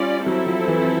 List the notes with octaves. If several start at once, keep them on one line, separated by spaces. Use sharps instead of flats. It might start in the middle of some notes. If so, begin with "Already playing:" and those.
Already playing: G3 C#4 F4 D5
F#3 C4 E4 A4
F3
E3